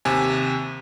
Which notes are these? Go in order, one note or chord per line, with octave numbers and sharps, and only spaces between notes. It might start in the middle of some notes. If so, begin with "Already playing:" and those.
D#2 C3 G#5